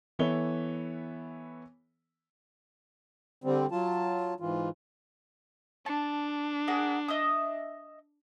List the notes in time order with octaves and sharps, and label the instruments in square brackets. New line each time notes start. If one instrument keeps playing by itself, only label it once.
[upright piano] E3 B3 A4 C#5 E5 G7
[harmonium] D3 G3 C4
F#3 F4 A5
G#2 E3 F4
[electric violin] D4 [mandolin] A5
[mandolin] G#4 A#4 F#5
D#5 E5 D#6